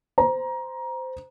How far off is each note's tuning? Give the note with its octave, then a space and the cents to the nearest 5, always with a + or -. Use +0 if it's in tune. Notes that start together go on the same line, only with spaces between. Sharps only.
C5 -15 A#5 +20